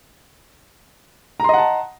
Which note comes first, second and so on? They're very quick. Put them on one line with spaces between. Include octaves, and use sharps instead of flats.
A#5 C6 D#5 F#5 A5